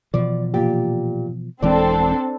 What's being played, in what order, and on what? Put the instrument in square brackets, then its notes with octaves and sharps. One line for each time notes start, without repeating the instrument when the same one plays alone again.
[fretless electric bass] B2 E3 F3 [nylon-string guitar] D5
[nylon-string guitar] A#2 G4
[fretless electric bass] D#1 E3 G#3 [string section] C4 D4 A4 [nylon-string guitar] D5